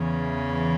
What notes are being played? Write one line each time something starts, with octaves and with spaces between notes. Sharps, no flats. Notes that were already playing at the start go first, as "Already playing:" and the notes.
Already playing: E2 C#3 E3